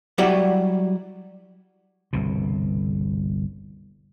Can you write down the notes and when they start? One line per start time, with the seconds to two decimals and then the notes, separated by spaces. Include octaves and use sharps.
0.18 F#3 G3 E4 F#4 G4 D5
2.13 G1 C2 B2